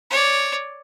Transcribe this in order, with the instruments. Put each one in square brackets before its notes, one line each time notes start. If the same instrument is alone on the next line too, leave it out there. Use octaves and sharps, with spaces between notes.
[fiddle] C#5 D5